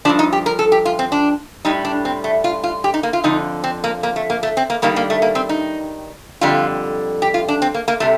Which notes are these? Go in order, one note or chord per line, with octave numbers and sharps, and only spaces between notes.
G2 F3 D4
D#4
G4
A#4
A4
G4
F4
C4
D4
A2 G3 D#4
D4
C4
A3
F4
F4
G4
D#4
A#3
F4
F2 D3 F3 D#4
C4
A#3
A#3
A3
A#3
A3
C4
A#3
G2 D#3 G3 A#3
A#3
A3
A#3
C4
D#4
F2 D3 G3 F4
G4
F4
D4
C4
A#3
A#3
C3 G3 A3